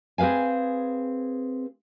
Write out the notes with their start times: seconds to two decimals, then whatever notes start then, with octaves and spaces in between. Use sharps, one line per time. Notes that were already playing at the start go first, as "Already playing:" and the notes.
0.18 C4 G#4 B4 F5 G#5